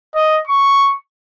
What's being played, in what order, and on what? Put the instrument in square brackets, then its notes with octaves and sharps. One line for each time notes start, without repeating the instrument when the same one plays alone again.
[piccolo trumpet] D#5
C#6